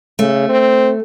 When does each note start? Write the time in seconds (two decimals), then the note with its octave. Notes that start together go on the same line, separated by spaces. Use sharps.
0.19 C#3 A3
0.49 C4